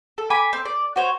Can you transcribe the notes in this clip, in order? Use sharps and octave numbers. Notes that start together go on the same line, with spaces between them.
A4
G#5 B5 D6
C4
D5
F#4 C5 C#5